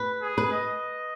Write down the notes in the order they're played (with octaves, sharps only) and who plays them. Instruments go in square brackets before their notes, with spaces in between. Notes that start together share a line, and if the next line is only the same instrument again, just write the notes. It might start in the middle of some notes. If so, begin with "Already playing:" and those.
Already playing: [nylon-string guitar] B4
[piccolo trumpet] G#4
[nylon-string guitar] B4
[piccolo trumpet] D#5